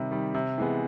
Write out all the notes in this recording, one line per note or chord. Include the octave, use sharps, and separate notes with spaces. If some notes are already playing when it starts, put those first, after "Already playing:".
Already playing: C3 D#3 G3
D#3 G3
C3
E3 G#3 B3